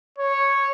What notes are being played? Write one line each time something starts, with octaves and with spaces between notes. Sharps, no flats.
C#5